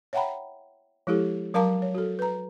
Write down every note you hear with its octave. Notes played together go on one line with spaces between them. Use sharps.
C#5 E5 F#5 G5 A#5 B5
F3 G#3 E4 G4 A4
F#3 A#4 F5 A5 A#5 D6
C#5
F#4 A4
B4 A#5